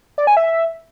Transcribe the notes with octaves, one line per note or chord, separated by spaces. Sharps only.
D5
G#5
E5